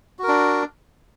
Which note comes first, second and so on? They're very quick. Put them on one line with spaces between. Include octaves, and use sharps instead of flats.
F#4 A#4 D4